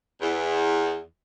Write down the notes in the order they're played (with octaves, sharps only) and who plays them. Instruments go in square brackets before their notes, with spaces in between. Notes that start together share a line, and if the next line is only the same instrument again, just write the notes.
[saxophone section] E2